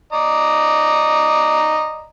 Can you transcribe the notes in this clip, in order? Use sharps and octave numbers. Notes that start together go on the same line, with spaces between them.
D5 D#5 A#5